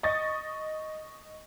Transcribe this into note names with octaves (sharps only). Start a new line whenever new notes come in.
D#5 C#6 D#6 A6